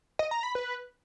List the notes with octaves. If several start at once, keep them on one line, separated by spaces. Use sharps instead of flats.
D#5
A#5
B5
B4